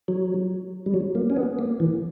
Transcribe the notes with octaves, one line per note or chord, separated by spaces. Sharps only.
F#3
G3
F#3
A#3
C#4
B3
A#3
E3